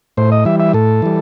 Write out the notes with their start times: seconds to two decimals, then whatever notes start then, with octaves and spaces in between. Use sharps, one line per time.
0.17 A2 C5
0.32 D#5
0.45 E3 G3 E5
0.60 E5
0.73 A2 A4
1.02 E3 G3